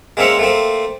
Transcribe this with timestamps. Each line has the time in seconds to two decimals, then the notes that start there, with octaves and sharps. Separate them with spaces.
0.17 G#3 A#3 C4 C#4 E5 F#5
0.39 A3 A#3 C4